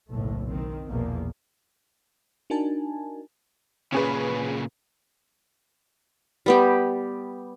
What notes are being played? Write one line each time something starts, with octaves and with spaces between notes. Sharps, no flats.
F#1 B1 A2 A3
D#3 C4
A#1 E2 B2 F3 A#3
D4 D#4 F#4 A#4 G#5 A5
A#2 C#3 C#4 G#4 B4
G3 B3 G4